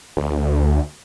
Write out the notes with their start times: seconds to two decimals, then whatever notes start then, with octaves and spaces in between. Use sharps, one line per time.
0.17 D2